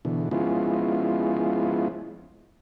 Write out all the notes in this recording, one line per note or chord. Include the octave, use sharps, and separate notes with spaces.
B2 D3 E3
F3 G#3 B3 C#4 E4 F4